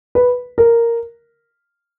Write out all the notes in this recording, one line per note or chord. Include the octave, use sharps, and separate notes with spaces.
B4
A#4